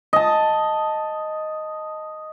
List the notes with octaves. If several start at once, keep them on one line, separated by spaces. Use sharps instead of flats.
D#5 A5